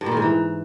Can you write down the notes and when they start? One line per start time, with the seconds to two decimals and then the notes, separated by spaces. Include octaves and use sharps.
0.01 G2
0.06 A#2
0.12 D#3
0.17 G#2
0.22 E3